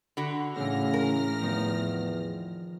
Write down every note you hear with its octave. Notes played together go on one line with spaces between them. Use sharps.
D3 F#4 B5
A2 C#3 E3 C4 F6 A#6
A#4
E2 D#3 F3 C4